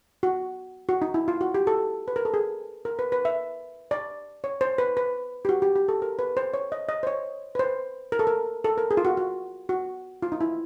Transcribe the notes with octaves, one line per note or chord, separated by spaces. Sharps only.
F#4
F#4
D#4
E4
F4
F#4
G4
A4
B4
A#4
A4
G#4
A#4
B4
B4
E5
D5
C#5
C5
B4
B4
G4
F#4
G4
G4
A4
A#4
B4
C5
C#5
D#5
D#5
C5
C#5
B4
C5
A#4
A4
A#4
A4
A#4
G#4
F4
F#4
F#4
F#4
F4
D#4
E4